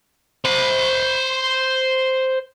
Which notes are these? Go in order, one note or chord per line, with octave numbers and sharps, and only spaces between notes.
C5 B5